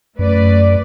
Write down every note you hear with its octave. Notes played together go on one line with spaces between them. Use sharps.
F#2 A3 B4 D5